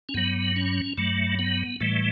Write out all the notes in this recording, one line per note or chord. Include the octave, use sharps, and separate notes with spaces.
C#4
G2 F#3 B3
C#4
G2 F#3 A3
B3
A2 E3 G3 A3